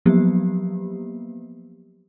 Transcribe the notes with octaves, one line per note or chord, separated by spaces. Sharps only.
F3 F#3 A#3 B3 G4